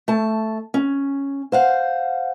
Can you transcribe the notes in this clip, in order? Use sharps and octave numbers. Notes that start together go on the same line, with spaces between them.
A3 A5
C#4
C5 F5 F#5